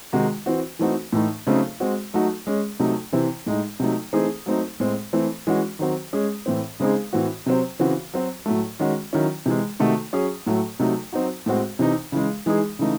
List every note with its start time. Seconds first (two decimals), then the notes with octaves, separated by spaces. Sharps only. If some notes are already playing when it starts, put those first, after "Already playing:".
0.13 C3 D#3 G#3 D#4 F#4
0.46 E3 C4 F#4
0.79 E3 A3 C4 D#4 F#4
1.13 A2 E3 A3 D#4
1.47 C#3 F#3 A3 C4 D#4
1.80 G#3 C4 F#4
2.14 F#3 A3 D#4 F#4
2.47 G#3 C#4 G#4
2.79 C3 F#3 A3 D#4
3.13 C3 E3 C4 E4
3.46 A2 G#3 D#4
3.80 C3 F#3 A3 D#4
4.13 E3 A3 C4 D#4 G#4
4.46 F#3 A3 C4 D#4
4.80 A2 G#3 C4
5.13 E3 A3 C4
5.47 E3 G#3 C#4 F#4
5.79 D#3 F#3 C4 F#4
6.13 G#3 C#4 G#4
6.46 A2 E3 C4
6.80 C#3 G#3 C4 D#4 G#4
7.13 A2 E3 C4 F#4
7.46 C3 F#3 C4 F#4
7.79 C#3 E3 C4 F#4
8.14 F#3 C4 F#4
8.46 A2 F#3 A3
8.79 D#3 G#3 C#4 F#4
9.13 D#3 F#3 C#4 E4
9.46 C3 E3 G#3
9.79 C3 D#3 A3 D#4 F#4
10.13 F#3 C#4 G#4
10.46 A2 F#3 A3
10.79 C3 F#3 A3 D#4
11.13 F#3 C4 D#4 F#4
11.46 A2 G#3 C4 F#4
11.79 C3 E3 C4 D#4
12.12 C#3 E3 G#3
12.46 E3 G#3 D#4 G#4
12.79 C#3 E3 A3 D#4